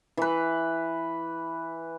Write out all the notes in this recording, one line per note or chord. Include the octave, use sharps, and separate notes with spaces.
E3 B4